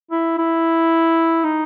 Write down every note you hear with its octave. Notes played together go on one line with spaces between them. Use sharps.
E4
E4
D#4